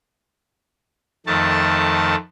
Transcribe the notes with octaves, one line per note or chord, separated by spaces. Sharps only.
F2 D#3 A3 A5